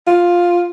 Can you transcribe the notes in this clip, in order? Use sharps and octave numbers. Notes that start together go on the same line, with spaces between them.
F4